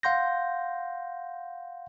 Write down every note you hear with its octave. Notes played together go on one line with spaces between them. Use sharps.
F5 F#5 C6 G6 A#6